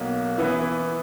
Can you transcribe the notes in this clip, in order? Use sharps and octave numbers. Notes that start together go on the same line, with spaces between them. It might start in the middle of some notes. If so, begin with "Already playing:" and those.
Already playing: B1 B2 A#3
E3 B3 E4